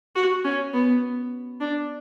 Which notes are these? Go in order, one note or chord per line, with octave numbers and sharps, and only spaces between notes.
F#4
C#4
B3
D4